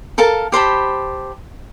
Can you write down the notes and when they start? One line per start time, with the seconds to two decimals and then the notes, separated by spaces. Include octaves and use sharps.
0.18 A4 A#4 F5 A5
0.52 G4 C5 A5 B5